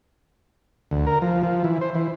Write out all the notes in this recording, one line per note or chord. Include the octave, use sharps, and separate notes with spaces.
D2
A#4
F3
F3
E3
C5
E3